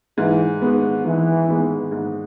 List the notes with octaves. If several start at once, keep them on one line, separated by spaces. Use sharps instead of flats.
G#2 E3
D#3 G#3 B3
G#2 E3
D#3 G#3 B3
G#2